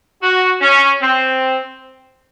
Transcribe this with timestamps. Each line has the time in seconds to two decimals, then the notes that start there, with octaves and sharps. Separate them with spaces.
0.22 F#4
0.61 C#4
1.02 C4